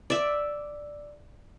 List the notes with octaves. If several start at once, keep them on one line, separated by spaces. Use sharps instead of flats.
D5 E5